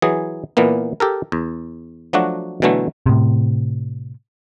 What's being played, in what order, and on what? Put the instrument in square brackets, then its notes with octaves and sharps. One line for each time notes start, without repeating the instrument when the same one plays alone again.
[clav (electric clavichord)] E3 F#3 G#4
A#2 E3 A#3 B3
G4 A4 A#4
E2
F3 F#3 A3 D4 F#4
B2 D3 E3 F#3 A3
[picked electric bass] A2 C3